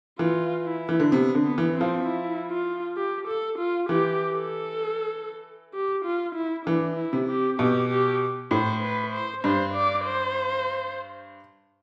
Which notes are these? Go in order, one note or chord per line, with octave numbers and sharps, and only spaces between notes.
E3 F4
E4
E3
D3
C3 B3
D3
B3
E3
C4
F3
E4
F4
G4
A4
F4
E3 G4
A4
G4
F4
E4
E3 D4
E4
C3
G4
B2 G4
G4
A2 C5
B4
C5
G2 C5
D5
C5